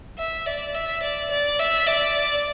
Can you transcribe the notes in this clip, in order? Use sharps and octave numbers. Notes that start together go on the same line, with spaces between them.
E5
D5
E5
D5
D5
E5
D5